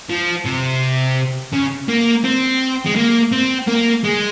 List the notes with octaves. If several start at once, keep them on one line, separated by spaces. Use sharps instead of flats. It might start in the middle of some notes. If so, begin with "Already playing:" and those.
F3
C3
C#3
A#3
C4
G#3
A#3
C4
A#3
G#3